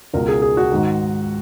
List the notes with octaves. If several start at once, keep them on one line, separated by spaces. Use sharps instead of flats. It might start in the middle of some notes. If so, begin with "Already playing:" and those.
C#2 B2 A#4
G#4
G#4
F#4
G#2 D#3